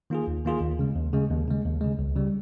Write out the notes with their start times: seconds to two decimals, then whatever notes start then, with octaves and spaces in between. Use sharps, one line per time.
0.10 D#3 A#3 F4 G#4
0.27 D#2
0.45 D#3 A#3 F4 G#4
0.61 D#2
0.79 C#3 G#3
0.95 D#2
1.13 C#3 G#3
1.30 D#2
1.48 C#3 G#3
1.65 D#2
1.81 C#3 G#3
1.99 C#2
2.16 C#3 G3